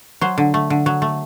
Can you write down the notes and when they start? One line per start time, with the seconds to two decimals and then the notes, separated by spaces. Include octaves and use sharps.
0.21 F#3 C5
0.38 D3
0.54 A3
0.70 D3
0.86 F#3
1.02 A3